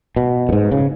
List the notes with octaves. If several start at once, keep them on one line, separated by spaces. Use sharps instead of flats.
B2
F#2
G#2
C#3